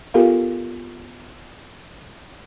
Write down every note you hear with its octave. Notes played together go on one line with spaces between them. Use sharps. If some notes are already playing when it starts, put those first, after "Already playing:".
B3 F4 G4 A4 A#4 F5